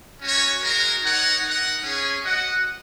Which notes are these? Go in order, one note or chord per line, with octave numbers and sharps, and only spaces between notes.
C#4 F#4 C#5
G#3 F#4 A#4
D#4 A#4 C#5 F#5
D#4 A#4 F#5
C#4 G#4 C#5
F#4 D#5 F#5